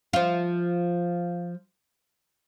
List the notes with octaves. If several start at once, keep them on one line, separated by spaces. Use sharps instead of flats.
F3 F4